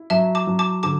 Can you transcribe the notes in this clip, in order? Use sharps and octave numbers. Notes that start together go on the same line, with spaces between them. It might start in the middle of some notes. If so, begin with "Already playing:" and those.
Already playing: E4
F#3 E5 A5
A5 D6
F#3
A5 D6
D3 A5 D6